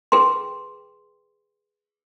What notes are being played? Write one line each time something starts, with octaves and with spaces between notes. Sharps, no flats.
G#4 B4 G5 C6